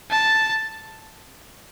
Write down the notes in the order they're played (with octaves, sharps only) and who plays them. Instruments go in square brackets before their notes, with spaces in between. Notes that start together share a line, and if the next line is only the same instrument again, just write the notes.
[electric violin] A5